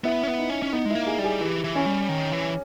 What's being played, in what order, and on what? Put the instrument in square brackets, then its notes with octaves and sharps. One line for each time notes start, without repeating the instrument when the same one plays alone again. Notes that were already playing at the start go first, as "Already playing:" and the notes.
[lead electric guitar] B3 [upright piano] E4
[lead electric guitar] C#4
B3
[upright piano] D#4
[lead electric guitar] C#4
C#4
[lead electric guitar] B3 [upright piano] D#4
[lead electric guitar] G#3
[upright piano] E4
[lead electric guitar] A#3
[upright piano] G#4
[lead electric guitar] G3
[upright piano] G#4
[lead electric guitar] E3 [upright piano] G4
[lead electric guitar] E3
[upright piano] C#4
[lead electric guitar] G3
D#3
E3